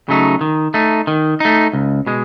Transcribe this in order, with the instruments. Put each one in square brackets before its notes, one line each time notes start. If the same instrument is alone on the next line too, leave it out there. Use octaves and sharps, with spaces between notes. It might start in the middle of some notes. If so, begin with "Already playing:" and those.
[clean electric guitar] C#3 F#3 A3 D#4
D#3
A3 D#4
D#3
A3 D#4
C#2
B2 G#3